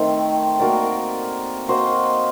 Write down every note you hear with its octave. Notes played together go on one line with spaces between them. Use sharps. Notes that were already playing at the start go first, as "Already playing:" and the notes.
Already playing: D#3 A3 C4
A#3 F#4 A#4 D5
A#3 F#4 C5 D#5